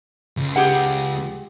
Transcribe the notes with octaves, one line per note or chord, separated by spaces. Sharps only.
C#2
G4 G#4 F#5